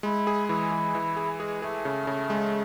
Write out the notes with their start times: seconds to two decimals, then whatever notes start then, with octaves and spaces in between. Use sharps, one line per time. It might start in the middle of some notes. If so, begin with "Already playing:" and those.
0.03 G#3 E4
0.27 G#4
0.49 E3 E4
0.71 E3
0.95 E3
1.16 G#4
1.39 G#3 G#4
1.62 A3 G#4
1.85 C#3
2.07 C#3
2.30 G#3